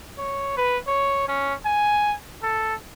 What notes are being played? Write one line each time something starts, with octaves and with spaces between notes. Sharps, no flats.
C#5
B4
C#5
C#4
G#5
A4